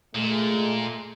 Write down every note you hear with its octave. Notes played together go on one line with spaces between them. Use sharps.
A#2 G#3 A3